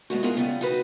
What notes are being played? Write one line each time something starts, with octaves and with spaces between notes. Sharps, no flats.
G#3 A3 B3 F#4
G#3 B3 D#4 F4 G#4 A#4
C#3 G3 B3
D#4 F#4 B4